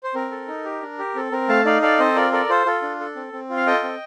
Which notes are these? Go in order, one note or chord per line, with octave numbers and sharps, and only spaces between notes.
C5
C4 A#4
A4
D#4
G4
D4
G4
C4 A4
C4 A#4
A3 F5 A5
D#4 D5 F5
A4 D5 F5
C4 C5 D#5
F4 A#4 D5
A4 A#4 D5
F4 A4 C5
F4 A4
D4
A4
C4
C4
F4
F5
A4 D#5 G5
C4